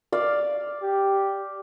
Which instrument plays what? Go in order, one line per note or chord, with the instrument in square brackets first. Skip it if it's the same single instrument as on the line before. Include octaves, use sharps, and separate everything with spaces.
[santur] D5 F5
[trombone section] G4